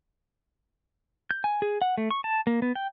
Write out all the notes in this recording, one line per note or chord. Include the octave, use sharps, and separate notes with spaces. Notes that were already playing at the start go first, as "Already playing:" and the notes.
G6
G#5
G#4
F#5
A3
C#6
A5
A#3
B3
G5